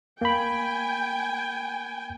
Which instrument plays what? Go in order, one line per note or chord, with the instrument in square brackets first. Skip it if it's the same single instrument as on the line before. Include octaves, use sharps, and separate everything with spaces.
[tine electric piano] A#3 B5 [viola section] G5 G#5